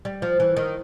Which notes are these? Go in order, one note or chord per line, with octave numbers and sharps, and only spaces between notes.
G3
F3
E3
D#3